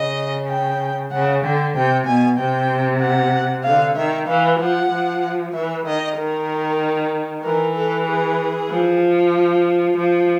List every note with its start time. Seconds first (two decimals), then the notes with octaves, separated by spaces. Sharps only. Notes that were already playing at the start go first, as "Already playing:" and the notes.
Already playing: C#3 D#5
0.49 G5
1.12 C#3 F#5
1.43 D3 G5
1.75 C3 G5
2.06 B2 G#5
2.38 C3 G5
3.01 F#5
3.64 D3 F5
3.96 D#3 E5
4.27 E3 F5
4.59 F3 F#5
4.91 F3
5.54 E3 E5
5.86 D#3 D#5
6.17 D#3 A#4
7.44 E3 A#4
7.76 A4
8.07 G#4
8.70 F3
9.97 F3